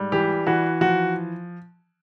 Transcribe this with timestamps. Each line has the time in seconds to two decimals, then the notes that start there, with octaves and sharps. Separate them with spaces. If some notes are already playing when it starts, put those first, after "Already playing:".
Already playing: G#2 G3
0.12 E3 G4
0.47 E3 F#4
0.81 F3 F#4